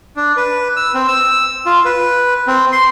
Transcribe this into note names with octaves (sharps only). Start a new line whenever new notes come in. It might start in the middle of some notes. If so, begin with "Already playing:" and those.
D4
B4
E6
C4
E6
F4
B4
C4
C6